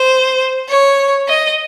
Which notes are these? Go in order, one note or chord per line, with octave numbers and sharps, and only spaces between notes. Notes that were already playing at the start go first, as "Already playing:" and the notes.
Already playing: C5
C#5
D#5